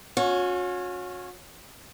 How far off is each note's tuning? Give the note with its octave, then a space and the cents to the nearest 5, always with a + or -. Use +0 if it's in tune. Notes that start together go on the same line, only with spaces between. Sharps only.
C#4 +0 F#4 -40